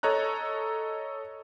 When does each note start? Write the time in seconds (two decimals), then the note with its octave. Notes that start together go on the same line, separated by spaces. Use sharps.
0.03 A4 C#5 D#5 A#5 F#6